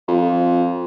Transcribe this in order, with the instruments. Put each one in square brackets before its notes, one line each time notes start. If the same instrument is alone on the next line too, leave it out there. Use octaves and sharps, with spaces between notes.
[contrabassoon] F2